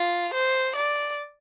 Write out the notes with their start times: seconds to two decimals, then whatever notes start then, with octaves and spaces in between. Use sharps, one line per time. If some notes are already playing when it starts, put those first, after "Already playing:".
Already playing: F4
0.34 C5
0.76 D5